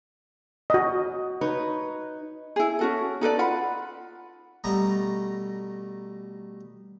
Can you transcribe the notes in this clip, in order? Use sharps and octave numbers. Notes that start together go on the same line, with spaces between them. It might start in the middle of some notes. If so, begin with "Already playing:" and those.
F#4 D#5
D#4 B4 C#5
E4 G#4
C#4 F#4 A4
D#4 A4 B4 D5
F4 F#5 B5
B2 G3 A3 A#5